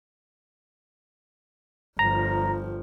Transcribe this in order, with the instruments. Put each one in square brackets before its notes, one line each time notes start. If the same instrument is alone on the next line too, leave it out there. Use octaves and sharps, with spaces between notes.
[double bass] G1 F3 [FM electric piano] A#5